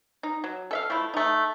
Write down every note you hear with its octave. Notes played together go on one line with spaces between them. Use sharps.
D#4
F#3
A4 E5 F5
F3 A3 E4
A3 D#4